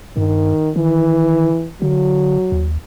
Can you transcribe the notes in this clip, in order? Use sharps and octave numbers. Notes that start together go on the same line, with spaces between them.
G2 D#3
D#3 E3
D3 F#3
D#2